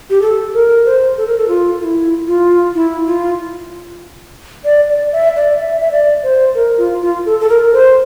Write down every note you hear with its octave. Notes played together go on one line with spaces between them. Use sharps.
G4
A4
A#4
C5
A4
A#4
A4
F4
F4
E4
F4
E4
F4
D5
D5
E5
D5
E5
E5
D5
C5
A#4
F4
F4
A4
A4
A#4
C5